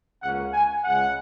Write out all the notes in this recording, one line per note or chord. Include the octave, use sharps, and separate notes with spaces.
C#2 C#3 A#3 C#4 F#5
G#5
C#2 C#3 G#3 F#5